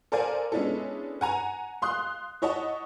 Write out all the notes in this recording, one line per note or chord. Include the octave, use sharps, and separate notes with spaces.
A4 A#4 C5 D5 F5 G#5
G#3 B3 C#4 D4 E4 A4
F#5 G#5 A#5
F5 C6 D#6 F#6
E4 C#5 D#5 F#5 A5